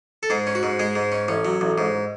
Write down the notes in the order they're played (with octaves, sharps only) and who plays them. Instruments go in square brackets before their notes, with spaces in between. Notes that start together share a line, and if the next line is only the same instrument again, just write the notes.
[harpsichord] A4
G#2 G#4
C#4
F#4
G#2
G#3 G#4
G#2
C#4
A1 C#4
F#3
A1
G#2